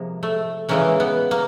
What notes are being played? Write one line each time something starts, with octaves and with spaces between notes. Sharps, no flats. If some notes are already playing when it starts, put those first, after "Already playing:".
Already playing: C3 F3 G#3 A#3
A3
C#3 E3 G#3 A#3
B3
A#3